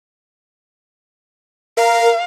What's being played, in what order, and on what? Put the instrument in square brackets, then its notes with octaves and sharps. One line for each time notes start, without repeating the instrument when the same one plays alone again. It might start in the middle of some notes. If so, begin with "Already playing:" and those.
[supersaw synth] A#4 [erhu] F5